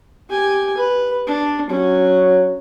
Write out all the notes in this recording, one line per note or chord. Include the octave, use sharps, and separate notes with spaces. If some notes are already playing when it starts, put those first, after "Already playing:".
G4 G#5
B4
D4
F#3 C#4